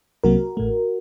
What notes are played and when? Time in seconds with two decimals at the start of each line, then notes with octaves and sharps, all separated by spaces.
0.24 C2 C3 F#3 A#3 F#4 A#4
0.57 A1 A2 A3